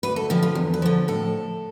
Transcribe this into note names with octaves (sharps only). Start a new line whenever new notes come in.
D2 B4
A4
D3 F3 G4
F4
E2
B4
D3 F3
A2 A4